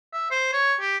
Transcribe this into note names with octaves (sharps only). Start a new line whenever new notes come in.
E5
C5
C#5
G4